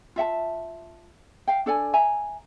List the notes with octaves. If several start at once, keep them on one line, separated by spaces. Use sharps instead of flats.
F4 E5 F#5 A5
F5 G5
D4 A4 D5 G#5
E5 G#5 A#5